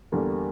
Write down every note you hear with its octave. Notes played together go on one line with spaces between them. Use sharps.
E2 D3 G3 A#3 A#4